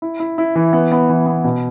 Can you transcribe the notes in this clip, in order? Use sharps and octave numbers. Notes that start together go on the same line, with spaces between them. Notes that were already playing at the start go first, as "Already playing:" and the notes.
E4
E4
E4
E3
B3
B3
E3
B3
B2